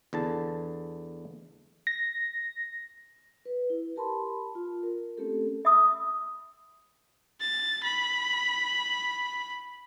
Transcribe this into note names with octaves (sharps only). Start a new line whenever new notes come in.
E2 D3 A5
A#6
B4
E4
G4 A#4 A5 B5 C6
F4
A#4
A3 A#3 C4 C#4 G4 A4
E5 B5 D#6 E6
A6
B5